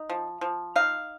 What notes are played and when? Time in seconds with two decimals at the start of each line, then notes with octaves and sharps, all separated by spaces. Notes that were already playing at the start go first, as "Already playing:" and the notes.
Already playing: D#4
0.10 F3
0.41 F3
0.76 D#4 F5